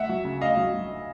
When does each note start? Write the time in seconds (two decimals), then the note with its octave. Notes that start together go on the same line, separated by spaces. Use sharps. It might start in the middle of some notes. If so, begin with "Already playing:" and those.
Already playing: D2 E5 F#5
0.09 F#3
0.24 C#3
0.41 D2 D#5 F5
0.57 F#3
0.74 F#3